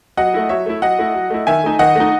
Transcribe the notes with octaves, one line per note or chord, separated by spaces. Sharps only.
F#3 D#5 F#5
A3 E4
F#3 C#5 E5
A3 E4
F#3 D#5 F#5
A3 E4
F#3
A3 E4
D#3 E5 G#5
A3 D#4
D#3 D#5 F#5
A3 D#4